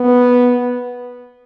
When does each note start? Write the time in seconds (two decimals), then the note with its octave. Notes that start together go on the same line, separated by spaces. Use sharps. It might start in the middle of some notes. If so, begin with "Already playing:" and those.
Already playing: B3